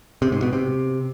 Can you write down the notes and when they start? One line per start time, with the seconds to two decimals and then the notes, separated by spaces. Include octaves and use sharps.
0.22 C3
0.32 G#2
0.42 B2
0.53 C3